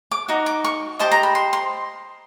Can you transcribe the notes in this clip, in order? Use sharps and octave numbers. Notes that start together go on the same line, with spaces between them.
D6
D#4 F#4
D6
C#6
G4 C5 D#5 A5
A#5
B5
C6
C6